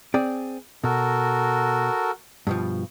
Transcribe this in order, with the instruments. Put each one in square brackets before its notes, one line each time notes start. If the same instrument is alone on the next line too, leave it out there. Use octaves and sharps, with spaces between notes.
[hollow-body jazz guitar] C4 G#4 D5
[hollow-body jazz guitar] B2 [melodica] F#4 A4 A#4
[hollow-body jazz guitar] G2 B2 F3